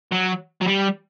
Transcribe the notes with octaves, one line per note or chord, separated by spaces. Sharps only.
F#3
F#3
G3